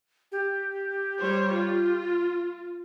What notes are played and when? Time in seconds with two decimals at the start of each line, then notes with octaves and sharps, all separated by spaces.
0.32 G4
1.17 G3 C5 C#5
1.52 F4